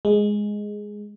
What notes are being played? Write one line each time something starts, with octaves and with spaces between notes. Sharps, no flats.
G#3